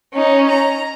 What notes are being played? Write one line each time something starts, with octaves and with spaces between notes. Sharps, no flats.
C#4 D#4
A#5